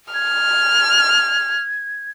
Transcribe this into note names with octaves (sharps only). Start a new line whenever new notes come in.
F6 G#6